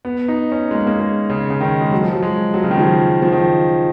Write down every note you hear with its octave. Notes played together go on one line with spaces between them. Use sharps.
B3
D#4
C#4
G#3
A#3
A#3
G#3
C#3
C#3
D#3
G#3
F#3
F3
F#3
G#3
F#3
C#3
D#3
F3
F#3
F3
D#3